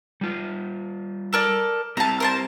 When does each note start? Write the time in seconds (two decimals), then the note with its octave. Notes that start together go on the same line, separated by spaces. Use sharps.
0.21 G3 F4
1.33 A4 A#4 D5
1.97 C4 E4 G4 A5 A#5
2.20 A#4 C5 A5